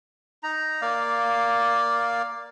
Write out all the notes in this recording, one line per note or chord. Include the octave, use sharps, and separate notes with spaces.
D#4 A#5
A#3 D5 F5